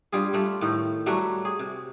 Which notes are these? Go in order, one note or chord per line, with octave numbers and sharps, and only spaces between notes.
G2 G3 F4 G#4
G3 A3 F4
A2 D#3
F#3 G3 A3 F#4
G#4
C3